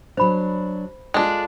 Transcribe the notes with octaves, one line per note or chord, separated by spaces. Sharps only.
F#3 D4 C5 B5
G#3 D4 F4 A4